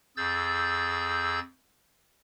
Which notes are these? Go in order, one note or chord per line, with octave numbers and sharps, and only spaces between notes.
F2 G#4 E6 G6 A6